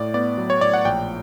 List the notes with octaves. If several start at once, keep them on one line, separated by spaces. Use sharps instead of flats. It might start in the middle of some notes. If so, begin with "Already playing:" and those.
Already playing: A2 D5
B3 D5
F#3
C#5
A2 D5
F#5
A#1 G5